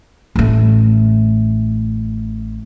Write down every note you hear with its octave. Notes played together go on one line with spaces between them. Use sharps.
A1 A3